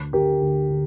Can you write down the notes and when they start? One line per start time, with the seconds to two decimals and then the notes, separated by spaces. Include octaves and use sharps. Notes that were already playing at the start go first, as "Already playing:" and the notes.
Already playing: D2
0.13 D3 G4 A#4
0.41 D2
0.70 D3